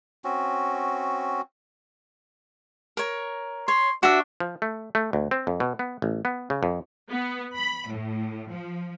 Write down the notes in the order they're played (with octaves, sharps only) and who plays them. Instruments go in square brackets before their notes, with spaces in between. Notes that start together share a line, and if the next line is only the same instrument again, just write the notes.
[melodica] C4 C#4 F#4
[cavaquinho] A#4 C#5
[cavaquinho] C#5 [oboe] C6
[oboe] D4 [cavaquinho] F#4 E5
[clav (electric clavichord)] F3
A3
A3
D2
C4
F2
B2
B3
A1
B3
C#3
F2
[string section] B3
B5
A2
F3